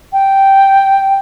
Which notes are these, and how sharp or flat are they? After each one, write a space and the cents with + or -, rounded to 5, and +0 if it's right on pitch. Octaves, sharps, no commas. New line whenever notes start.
G5 -5